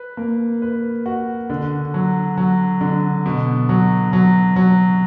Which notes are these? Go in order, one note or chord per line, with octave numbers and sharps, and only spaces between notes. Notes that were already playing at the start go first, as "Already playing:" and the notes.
Already playing: B4
A#3
B4
F#4
D3
F#3
F#3
D3
B2
F#3
F#3
F#3